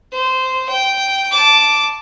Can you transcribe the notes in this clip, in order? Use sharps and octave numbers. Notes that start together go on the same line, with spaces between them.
C5
G5
A5 D6